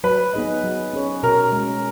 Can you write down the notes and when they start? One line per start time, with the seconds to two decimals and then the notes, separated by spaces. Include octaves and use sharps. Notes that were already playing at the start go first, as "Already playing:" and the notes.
0.04 F#3 B4
0.33 B3 D#4 G#4 D#5
0.63 F#3
0.93 C#4 G#4 C#5
1.23 B2 A#4
1.52 G#3
1.57 C#4